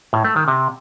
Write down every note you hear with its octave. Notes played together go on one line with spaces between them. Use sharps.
A2
A3
D#3
C3